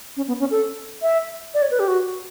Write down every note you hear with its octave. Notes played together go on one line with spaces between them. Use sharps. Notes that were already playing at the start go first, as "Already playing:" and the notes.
C#4
B3
C#4
A4
E5
D5
C#5
B4
G4
F#4